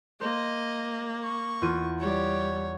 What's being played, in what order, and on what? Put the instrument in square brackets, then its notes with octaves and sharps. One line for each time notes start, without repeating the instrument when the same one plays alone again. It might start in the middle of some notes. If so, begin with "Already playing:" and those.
[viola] A#3 [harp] C5 [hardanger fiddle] D#5
[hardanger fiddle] C#6
[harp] E2 F4 D#7
[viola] G3 [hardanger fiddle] C#5